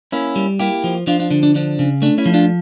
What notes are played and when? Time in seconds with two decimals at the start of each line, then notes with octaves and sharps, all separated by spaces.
0.12 A#3 C#4 E4
0.36 G3
0.60 A#3 E4 G4
0.84 F3
1.07 F3 D4 F4
1.20 D4 F4
1.31 D3 D4
1.43 D4
1.55 F3 D4
1.79 C#3
2.02 A3 D4
2.18 C#4 E4
2.26 F3
2.34 D4 F4